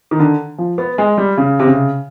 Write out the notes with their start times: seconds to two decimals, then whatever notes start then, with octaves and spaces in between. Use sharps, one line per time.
0.11 D#3
0.20 D3
0.58 F3
0.78 B3
0.98 G#3
1.18 G3
1.37 C#3
1.60 C3
1.67 C#3